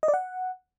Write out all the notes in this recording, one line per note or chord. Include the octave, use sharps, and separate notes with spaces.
D#5
D5
F#5